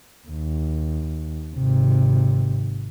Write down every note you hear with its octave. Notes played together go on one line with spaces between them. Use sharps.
D#2
G#1 C3